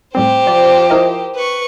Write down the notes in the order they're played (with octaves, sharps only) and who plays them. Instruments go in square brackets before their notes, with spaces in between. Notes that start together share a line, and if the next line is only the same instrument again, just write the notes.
[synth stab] A2 G3 C4 [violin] G4 C5
[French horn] F3 [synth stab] D5
[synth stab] E4 A#4 D#5
[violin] B4 C#6